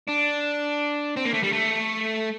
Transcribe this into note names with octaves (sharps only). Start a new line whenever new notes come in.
D4
C4
A#3
A3
G3
A3